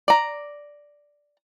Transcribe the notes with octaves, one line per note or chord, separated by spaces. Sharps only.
D5 A#5